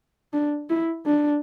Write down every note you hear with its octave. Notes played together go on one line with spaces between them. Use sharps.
D4
E4
D4